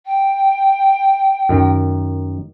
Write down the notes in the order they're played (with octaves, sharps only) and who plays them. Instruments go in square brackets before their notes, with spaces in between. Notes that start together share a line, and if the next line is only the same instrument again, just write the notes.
[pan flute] G5
[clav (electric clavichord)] F#2 D#3